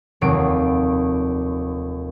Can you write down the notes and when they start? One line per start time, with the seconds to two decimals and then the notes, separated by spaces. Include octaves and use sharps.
0.21 F1 D#2 F#3 D7